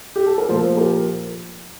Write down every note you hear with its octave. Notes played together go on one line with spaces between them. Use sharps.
G4
A4
A#4
A#2 F3 A4 C5
G4 A#4